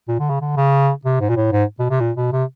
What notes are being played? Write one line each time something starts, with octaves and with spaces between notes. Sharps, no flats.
A#2
D3
C#3
D3
C#3
C3
G#2
A#2
A2
G#2
B2
C3
A#2
B2
C3